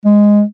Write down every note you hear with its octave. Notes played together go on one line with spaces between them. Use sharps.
G#3